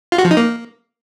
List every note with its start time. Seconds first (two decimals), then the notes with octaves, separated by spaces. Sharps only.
0.12 F4
0.18 F#4
0.25 F3
0.31 D#4
0.37 A#3